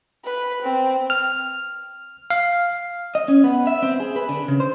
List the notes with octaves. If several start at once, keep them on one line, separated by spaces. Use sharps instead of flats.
B4
C4
F6
F5
D#5
C#4
B3
E5
C4
G#4
B4
D3
C#3
C5